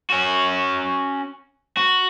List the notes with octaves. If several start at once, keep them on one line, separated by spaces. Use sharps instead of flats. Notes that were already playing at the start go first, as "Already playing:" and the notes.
C#4 F#4
F#4